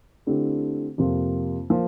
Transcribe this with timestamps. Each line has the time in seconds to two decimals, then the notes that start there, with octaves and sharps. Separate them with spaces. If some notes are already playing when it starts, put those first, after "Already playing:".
0.27 D3 A3 C4 E4 G4
0.98 F2 C3 F3 A#3 F4
1.70 F3 A#3 F4